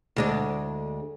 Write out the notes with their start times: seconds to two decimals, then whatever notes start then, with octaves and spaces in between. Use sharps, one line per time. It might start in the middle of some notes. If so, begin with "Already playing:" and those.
0.16 D2 G#3 D4